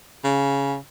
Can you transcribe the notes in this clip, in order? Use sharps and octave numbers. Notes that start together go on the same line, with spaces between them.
C#3